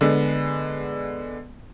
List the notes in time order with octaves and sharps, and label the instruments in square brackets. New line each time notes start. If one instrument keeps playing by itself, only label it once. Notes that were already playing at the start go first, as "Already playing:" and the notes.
[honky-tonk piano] D3 G#3 B3